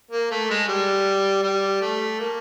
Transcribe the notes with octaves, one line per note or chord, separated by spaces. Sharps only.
A#3
A3
G#3
G3
G3
A3
A#3